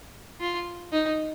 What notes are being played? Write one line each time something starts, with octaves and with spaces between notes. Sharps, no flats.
F4
D#4